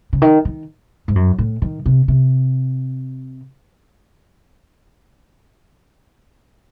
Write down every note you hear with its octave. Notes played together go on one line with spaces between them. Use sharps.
C#3
D#3
D#3
G#2
F#2
A2
D#3
C3
C3